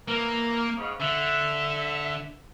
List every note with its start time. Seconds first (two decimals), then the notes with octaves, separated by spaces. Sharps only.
0.08 E3 A#3 A#4
0.77 G#2 C#3
1.00 D3 E5